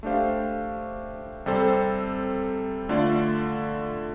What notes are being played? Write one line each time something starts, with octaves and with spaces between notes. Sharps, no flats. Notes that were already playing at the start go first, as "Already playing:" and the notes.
A3 D4 G4 C5 F5
C3 G3 C4 A4 C5
D3 A3 F4 D5